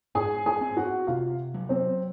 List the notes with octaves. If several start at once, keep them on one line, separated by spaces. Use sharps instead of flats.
G#2 G#4 G#5
G#4 G#5
C4
F#4 F#5
C3 F4 F5
F#3
C4 C5